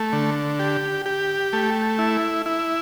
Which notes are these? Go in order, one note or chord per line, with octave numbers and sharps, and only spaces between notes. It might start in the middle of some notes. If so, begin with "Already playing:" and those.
Already playing: A3
D3
G4
G4
A3
E4
E4